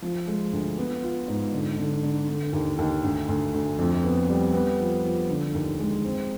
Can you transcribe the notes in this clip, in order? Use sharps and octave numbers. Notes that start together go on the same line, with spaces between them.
F3
G#3
D2
B3
F4
G#2
D3
D3
D3
D3
D#2
D#2
D2
D2
D2
F2
B3
G3
B3
F3
F3
D3
D#2
G#3
C4